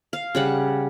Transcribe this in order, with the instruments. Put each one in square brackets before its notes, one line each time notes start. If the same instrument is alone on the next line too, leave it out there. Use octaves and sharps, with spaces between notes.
[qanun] F5
C#3 G3 F#5